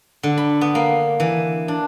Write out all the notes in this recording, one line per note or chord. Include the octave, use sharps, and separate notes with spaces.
D3
B5
B3
A#3
E3
D4